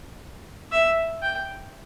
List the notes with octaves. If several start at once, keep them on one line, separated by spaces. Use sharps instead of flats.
E5
G5